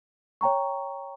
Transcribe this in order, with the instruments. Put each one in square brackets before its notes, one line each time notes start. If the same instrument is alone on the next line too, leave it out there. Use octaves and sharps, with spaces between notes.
[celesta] C#5 G5 A#5 C#6